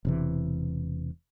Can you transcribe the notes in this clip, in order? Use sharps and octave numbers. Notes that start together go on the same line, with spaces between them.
E1 C3 E3